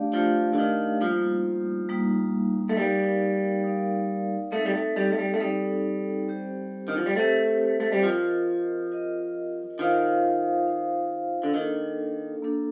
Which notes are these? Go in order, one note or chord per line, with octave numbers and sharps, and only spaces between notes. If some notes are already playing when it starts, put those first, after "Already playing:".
Already playing: A3 D4 G4 D5 F5
F3 A3 D4 G4 D5 F5
D3
D#3
F3 G3 A#3 D#4
G3 A#3 D#4
A3
G3 D#4 A#4 D5 F5
D#4 A#4 D5 F5
A3 C4 D#4 A4
G3
A3
G3
A3
G3
A3
G3 C4 D#4 A4
C4 G4 C5
D#3
F3
G3
A3 C4 G4 C5
A3
G3
F3 F4 A#4 D#5
F4 A#4 D#5
D#3 F4 C5 F5
F4 C5 F5
D3
D#3 A#3 D4 A4
A#3 D4 A4